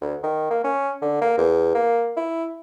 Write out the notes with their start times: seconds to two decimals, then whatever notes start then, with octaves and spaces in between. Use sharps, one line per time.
0.01 D2
0.23 D#3
0.51 A#3
0.64 C#4
1.02 D3
1.22 A#3
1.38 E2
1.75 A#3
2.17 E4